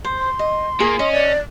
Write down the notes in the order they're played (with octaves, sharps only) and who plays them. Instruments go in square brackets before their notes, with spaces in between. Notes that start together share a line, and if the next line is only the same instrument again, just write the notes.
[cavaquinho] C5
[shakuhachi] C6
[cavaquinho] D#5
[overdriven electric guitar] A#2 A#3 [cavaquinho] G#4
[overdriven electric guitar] C#4 [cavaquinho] D#5
[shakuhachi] D5